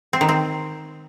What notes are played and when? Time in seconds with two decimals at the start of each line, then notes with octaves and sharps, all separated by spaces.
0.13 C4
0.21 D#3
0.29 C4